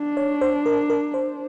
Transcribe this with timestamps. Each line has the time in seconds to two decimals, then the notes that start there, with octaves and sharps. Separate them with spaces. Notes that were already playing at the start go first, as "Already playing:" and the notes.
Already playing: D4
0.17 C#5
0.41 C5
0.66 A#4
0.90 A#4
1.14 C5